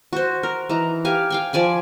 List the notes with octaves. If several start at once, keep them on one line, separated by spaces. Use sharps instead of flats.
F#4 C5
A#4
E3 D#4 A#5
G4 F5 G#5
F5 G5 G#5
F3 D5 G#5 B5